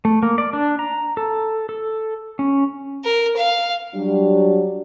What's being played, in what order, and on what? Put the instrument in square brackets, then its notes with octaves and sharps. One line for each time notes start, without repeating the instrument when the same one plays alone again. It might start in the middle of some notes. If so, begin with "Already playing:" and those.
[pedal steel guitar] A3
A#3
D5
D4
A#5
A4
A4
C#4
[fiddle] A#4
F5
[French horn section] F#3 G3 D4